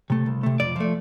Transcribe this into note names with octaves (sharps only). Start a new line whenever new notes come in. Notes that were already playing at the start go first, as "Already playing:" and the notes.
C3 A3
C2
C3 A3
F2 D5
F3 A3